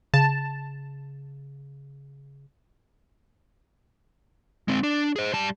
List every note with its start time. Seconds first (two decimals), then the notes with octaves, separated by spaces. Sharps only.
0.14 C#3 A5
4.68 G#3 C4
4.83 D4
5.16 G#4 C5
5.33 G3 A5